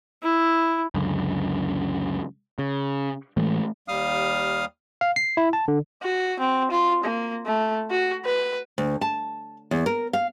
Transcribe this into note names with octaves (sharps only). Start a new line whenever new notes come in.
E4
C#2 F#2 D3
C#3
A2 E3 G#3 A3
D#2 G3 F5 D#6 F6
F5
C7
E4
A5
D3
F#4
C4
F4
A#3
A3
F#4
B4
D2
A5
E2
A#4
F5